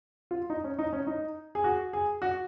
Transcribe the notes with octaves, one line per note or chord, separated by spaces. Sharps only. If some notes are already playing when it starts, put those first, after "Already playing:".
F4
D#4
C#4
D#4
C#4
D#4
G#4
F#4
G#4
F#4